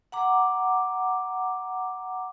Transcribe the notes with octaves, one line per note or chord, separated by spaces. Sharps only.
F#5 A#5 D6